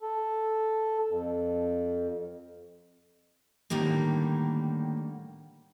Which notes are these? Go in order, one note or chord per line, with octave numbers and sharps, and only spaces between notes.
A4
F2
A2 D3 D#3 G3 A#3